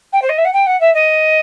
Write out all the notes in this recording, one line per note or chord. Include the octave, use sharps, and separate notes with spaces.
G5
C5
D#5
E5
F#5
G5
F#5
E5
D#5